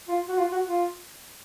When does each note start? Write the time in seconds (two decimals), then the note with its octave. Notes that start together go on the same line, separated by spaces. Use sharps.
0.08 F4
0.28 F#4
0.38 F4
0.52 F#4
0.66 F4